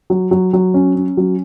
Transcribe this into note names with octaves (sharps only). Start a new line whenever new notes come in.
F#3
F#3
F#3
C#4
C#4
F#3